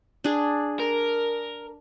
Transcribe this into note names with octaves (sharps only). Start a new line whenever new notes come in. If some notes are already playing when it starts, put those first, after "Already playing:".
D4 G#4
A#4